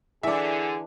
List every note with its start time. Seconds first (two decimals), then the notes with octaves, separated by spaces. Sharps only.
0.23 D3 E3 D4 G#4 E5